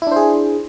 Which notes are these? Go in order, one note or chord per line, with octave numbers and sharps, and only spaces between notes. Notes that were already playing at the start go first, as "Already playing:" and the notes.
D4 E4 G#4 C5